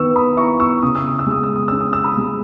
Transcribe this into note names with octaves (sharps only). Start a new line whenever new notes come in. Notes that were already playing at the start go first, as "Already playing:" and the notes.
Already playing: D#3 B3 C#6 E6
B5 D#6
E4 A#5 C#6
C#6 E6
C#3 D#6
E6
D#6
E6
G#3 D#6
E6
D#6
C#4 E6
D#6
E6
B5 D#6
G#3